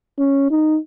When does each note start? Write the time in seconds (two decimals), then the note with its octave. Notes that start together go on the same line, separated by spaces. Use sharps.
0.19 C#4
0.51 D#4